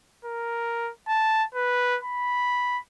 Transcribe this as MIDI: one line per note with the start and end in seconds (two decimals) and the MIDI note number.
0.25 0.91 70
1.08 1.44 81
1.55 1.98 71
2.03 2.79 83